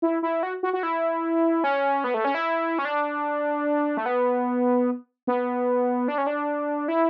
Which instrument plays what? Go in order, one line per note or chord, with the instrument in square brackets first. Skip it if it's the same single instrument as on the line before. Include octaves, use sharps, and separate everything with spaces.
[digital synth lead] E4
E4
F#4
F#4
F#4
E4
C#4
B3
A3
C#4
E4
C#4
D4
A3
B3
B3
D4
C#4
D4
E4